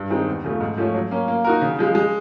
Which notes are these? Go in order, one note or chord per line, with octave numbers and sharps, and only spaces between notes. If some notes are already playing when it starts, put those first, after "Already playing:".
Already playing: G2
D#3 G#3 C4 D#4
E2
C#3 F3 A3
G#2
F3 A3 C#4
F#3
A#3 C#4
A#3
D#4 F#4 A#4
C#3
F3 G#3
G#3